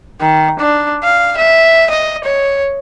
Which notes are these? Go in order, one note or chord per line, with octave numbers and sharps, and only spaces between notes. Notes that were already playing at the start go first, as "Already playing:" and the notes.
D#3
D4
F5
E5
D#5
C#5